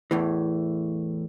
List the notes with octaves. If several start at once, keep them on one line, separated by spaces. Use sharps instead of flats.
E2 A2 E3